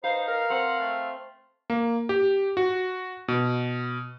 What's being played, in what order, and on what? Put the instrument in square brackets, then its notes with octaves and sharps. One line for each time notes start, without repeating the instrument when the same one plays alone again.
[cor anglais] D#4 [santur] B4 [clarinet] C5 [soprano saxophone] F5
[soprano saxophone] A#4 [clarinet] F5
[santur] C4 [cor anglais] F#5
[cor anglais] A3
[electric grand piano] A#3
G4
F#4
B2